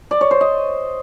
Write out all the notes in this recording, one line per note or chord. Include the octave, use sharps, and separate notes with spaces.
D5
C#5
C5
D#5